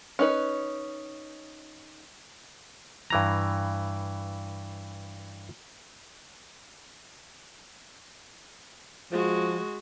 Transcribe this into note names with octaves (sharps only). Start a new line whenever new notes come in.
C#4 D#4 B4
G2 E3 A#5
F3 G#3 F#4